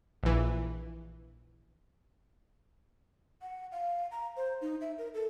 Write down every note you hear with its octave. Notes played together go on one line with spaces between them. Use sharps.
A#1 E3
F#5
F5
A#5
C5
D#4
E5
A#4
A4